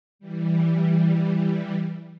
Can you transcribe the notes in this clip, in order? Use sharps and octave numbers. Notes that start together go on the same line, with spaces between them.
E3 G3